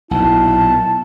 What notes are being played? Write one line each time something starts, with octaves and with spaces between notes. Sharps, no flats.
B1 A#2 E4 A5